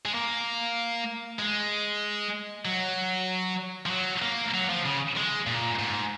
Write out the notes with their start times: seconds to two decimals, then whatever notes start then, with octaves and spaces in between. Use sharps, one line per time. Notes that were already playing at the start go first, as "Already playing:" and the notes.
0.05 G#3
0.14 A#3
1.39 G#3
2.65 F#3
3.86 F3
3.90 F#3
4.22 A#3
4.54 F#3
4.69 F3
4.85 C#3
5.16 G#3
5.47 A#2
5.79 G#2